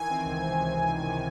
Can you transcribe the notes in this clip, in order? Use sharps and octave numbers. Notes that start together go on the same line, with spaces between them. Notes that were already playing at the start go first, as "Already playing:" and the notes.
Already playing: D#3 E3 G#5
C4
C#2
C3
E3
C4
C#2
C3